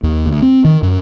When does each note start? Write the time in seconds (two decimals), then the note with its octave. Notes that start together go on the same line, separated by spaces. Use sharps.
0.03 D#2
0.26 D2
0.42 C4
0.65 D#3
0.82 F#2